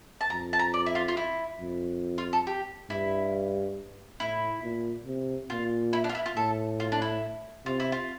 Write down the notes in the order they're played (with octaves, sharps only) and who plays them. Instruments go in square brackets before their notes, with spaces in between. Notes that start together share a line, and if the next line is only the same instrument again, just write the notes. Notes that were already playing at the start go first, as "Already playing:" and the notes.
[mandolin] A5
[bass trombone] F2 [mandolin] A#5
[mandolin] A5
A#5
D5
E4
F4
F4
E4
[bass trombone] F2
[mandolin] F4
A4
G4
[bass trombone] G2 [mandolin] E4
[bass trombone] A2 [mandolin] E4
[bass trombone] A#2
C3
[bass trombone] A#2 [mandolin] F4
[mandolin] E4
D4
F4
E4
F4
[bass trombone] A2 [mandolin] A4
[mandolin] F4
D4
E4
[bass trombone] C3 [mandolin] F4
[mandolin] E4
F4